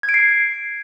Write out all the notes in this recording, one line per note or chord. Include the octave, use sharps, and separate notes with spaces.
G#6
D7
C7